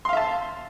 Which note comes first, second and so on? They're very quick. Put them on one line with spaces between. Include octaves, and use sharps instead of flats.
C6 F5 E5 A5